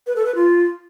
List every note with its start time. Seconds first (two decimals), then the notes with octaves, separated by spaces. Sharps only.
0.07 B4
0.16 A4
0.26 B4
0.35 F4